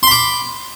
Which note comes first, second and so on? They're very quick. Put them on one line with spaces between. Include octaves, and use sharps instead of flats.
C6 B5 D6